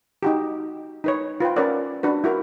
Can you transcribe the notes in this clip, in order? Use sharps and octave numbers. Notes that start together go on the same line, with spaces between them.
D#4 F#4 G4
D#4 B4 C#5
F4 B4 C5 G5
C#4 A#4 B4 C#5 D5 F#5
D4 F#4 B4
E4 F#4 A#4